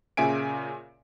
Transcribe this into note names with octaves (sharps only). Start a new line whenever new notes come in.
A#2 C#3 E5 G#5 D7